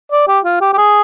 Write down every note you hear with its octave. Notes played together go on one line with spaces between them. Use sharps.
D5
G4
F4
G4
G4
G#4